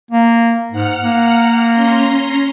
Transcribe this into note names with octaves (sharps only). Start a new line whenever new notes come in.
A#3
G#2 F#5 F6
A#3
C#4 A#5 C6